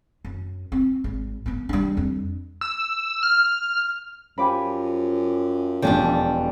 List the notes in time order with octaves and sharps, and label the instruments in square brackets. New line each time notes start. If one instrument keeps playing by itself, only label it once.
[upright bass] F#2
C4
G#1
A#3 B3
G3 D4
F2 D4
[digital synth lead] E6
F6
[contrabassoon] F#2 [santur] F3 G4 G#5 [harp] B5 D6
[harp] E1 F2 [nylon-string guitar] G3 B3 D4 [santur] A4 E6